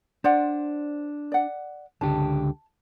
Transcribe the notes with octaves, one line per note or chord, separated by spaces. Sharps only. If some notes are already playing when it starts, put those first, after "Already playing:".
D4 C5 D5 F#5
D5 F#5
C#2 D3 G4 A5